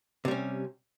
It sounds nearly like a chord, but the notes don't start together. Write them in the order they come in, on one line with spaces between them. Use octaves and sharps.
C3 G3 C#4